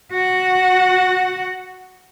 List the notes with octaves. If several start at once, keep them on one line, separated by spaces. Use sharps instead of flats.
F#4 F#5